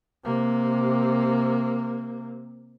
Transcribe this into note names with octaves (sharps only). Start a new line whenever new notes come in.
C3 A#3